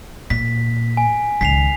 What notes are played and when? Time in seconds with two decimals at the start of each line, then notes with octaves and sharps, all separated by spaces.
0.30 A#2 B6
0.97 G#5
1.41 C#2 D#3 B6 C7 F7